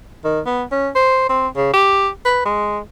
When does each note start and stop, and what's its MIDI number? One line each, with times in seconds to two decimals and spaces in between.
0.24 0.40 51
0.46 0.63 59
0.72 0.89 61
0.95 1.25 72
1.29 1.48 60
1.56 1.72 49
1.74 2.09 67
2.25 2.42 71
2.46 2.79 56